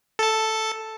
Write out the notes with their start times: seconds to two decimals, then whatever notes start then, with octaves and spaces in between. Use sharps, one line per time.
0.19 A4 A5